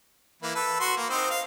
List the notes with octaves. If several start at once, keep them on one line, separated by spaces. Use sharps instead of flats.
E3 A#3
A4 B4
F#4 C6
A#3
C4 D#4 C5
F5